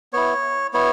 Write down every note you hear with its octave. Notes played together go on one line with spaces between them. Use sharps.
B3 E4 C#5
B3 E4 C#5